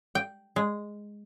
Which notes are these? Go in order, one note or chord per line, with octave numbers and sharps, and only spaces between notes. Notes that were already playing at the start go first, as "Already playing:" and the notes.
G5
G#3